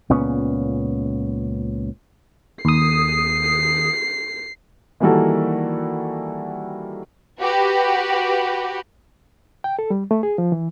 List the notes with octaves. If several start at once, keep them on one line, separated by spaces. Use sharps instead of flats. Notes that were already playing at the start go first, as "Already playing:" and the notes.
C#2 A#2 B3 C#4
D#2 D#6 C7
D#3 E3 G3 A#3 F#4 A4
F#4 G4 B4
G5
A4
G3
A3
G#4
F3
E3